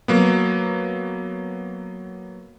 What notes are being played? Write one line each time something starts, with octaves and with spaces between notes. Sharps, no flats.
F#3 A#3 B3